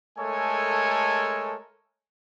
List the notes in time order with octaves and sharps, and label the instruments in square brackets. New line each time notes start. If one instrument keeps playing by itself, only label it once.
[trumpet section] G#3 A3 A4 A#4 C#5 G#5